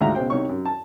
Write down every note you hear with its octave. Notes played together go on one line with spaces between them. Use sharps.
D2 G#2 F4 F#4 E5 A#5
B1 C#3 C5 G5
C2 D#4 C#5 C#6
F#2
A5